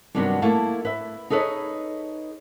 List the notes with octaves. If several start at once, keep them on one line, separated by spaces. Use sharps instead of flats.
G2 C3 D#3 F#3 B3 D4
A3 A#3 E4 F5 A5
B4 E5
D#4 G#4 A4 B4 C#5 D#5